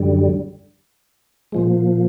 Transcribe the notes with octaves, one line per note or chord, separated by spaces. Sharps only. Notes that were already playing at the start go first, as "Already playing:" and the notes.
Already playing: F#2 D3 G3
A#2 F3 G#3